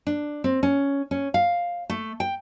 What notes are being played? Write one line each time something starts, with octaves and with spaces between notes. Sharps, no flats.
D4
C4
C#4
C#4
F5
A3
G5